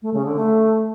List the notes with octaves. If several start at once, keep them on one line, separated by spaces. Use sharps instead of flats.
A3
C#3
D3
A3